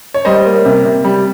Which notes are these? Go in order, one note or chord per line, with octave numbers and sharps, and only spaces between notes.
C#5
G3 C5 D#5
A#3
C3
C3
G3